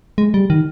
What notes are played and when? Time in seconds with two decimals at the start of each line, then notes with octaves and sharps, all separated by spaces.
0.18 G#3
0.34 G3
0.50 D#3